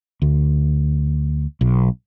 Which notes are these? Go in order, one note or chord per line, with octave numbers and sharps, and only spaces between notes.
D2
B1